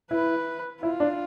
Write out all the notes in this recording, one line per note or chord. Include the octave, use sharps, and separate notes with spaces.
E4 B4
E4 F4
D4